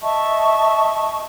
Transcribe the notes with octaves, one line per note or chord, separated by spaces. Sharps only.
D#5 E5 A5 C#6